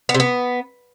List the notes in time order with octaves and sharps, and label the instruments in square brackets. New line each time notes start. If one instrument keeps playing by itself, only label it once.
[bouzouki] B3
C3
B3